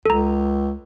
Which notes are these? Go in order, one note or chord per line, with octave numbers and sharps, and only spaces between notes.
C#2 A4 A#5